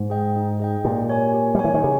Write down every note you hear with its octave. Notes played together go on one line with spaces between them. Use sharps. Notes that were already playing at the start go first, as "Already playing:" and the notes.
Already playing: G#2
G#4 D#5 G5
D#4
G#4 D#5 G5
A#2 G4
C#5 G#5
G4
G3
C#5 G#5
E3
D#3
C#3 G4